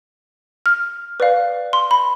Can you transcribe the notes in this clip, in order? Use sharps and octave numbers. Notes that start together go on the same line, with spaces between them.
F6
B4 D5 F5
C6
B5